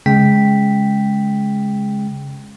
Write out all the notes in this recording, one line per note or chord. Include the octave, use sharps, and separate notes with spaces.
C#3 G#3 G5 B6